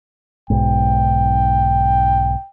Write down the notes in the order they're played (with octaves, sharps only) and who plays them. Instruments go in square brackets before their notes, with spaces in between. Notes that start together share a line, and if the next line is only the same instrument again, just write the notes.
[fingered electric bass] B1 G#2 [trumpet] G5